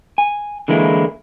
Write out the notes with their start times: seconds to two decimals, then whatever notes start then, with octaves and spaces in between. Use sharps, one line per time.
0.18 G#5
0.68 D3 E3 G#3 A#3 E4